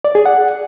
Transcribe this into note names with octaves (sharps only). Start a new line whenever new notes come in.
D5
G#4
F#5